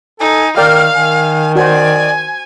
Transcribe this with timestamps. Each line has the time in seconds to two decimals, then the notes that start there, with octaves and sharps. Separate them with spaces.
0.20 D#4 A4 G#5
0.57 D#3 A#4 D5 F5 G5 F6
0.94 D#3 G#5
1.56 F#4 C5 D5 G#5